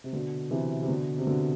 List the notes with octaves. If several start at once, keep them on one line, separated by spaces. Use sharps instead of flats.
C3
B2 D3
C3 E3
C3
B2 D3
C3
B2 D3